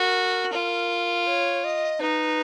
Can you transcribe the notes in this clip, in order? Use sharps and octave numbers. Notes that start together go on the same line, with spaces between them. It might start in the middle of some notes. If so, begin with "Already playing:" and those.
Already playing: F#4 A#4
F4
C#5
D#5
D#4 B4